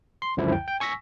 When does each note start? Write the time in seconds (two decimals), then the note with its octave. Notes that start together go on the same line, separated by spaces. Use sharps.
0.22 C6
0.37 C#2 F#2 D3 F3 E4 C5
0.52 G5
0.68 G5
0.80 G#5 C#6 E6 A#6 B6